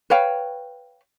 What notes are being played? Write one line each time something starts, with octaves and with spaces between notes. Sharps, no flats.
B4 C#5 F5 G5